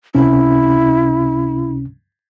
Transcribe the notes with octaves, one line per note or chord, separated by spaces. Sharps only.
C#2 C3 C#4 E4